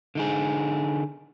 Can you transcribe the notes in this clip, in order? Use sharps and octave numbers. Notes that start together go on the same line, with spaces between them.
D3 D#4 G#4